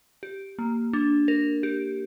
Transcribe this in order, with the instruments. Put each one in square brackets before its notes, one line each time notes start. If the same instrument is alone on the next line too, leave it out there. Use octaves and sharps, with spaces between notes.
[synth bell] G4
A#3
D4
A#4
G4